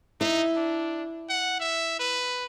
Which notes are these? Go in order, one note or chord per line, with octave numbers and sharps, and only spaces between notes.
D#4 E4
D4
F#5
E5
B4